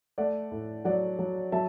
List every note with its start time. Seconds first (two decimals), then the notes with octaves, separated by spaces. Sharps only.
0.18 A3 D5 F#5
0.51 A2
0.85 F#3 D5 F#5
1.19 F#3
1.52 F#3 E5 A5